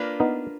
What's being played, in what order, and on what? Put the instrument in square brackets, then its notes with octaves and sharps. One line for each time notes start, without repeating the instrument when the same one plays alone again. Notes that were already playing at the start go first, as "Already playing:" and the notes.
Already playing: [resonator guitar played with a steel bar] A#3 D4 F4 B4
[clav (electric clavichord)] B3 D#4